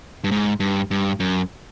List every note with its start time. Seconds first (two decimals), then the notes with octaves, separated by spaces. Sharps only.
0.24 G2
0.31 G#2
0.60 G2
0.91 G2
1.20 F#2